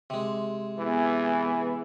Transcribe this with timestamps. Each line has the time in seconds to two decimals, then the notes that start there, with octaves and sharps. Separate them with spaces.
0.10 C3 G#3
0.79 E3 B3 G#4